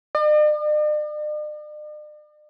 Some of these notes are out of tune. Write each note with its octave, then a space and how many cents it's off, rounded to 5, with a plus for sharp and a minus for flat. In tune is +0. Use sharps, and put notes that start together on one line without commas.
D5 +45